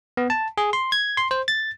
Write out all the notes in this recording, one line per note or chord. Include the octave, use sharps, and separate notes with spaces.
B3
A5
G#4
C6
G#6
C6
C5
A6